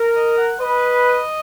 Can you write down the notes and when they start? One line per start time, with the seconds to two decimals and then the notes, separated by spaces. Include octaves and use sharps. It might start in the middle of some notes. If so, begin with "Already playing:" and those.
Already playing: A#4
0.16 D#5
0.37 F#5
0.60 B4 D#5